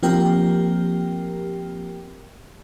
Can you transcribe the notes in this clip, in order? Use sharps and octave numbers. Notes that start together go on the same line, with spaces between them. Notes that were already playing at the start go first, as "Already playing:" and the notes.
F3 A#3 C4 G4 A#4 G5